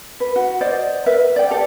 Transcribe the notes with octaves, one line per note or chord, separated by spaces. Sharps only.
B4
F#4
C5 D5 D#5
A#4 B4 E5
D5 G5
G4 A4